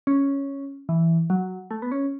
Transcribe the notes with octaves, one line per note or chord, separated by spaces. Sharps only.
C#4
E3
F#3
A3
B3
C#4